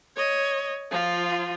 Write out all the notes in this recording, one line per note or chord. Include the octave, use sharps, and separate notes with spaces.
C#5 D#5
F3 F4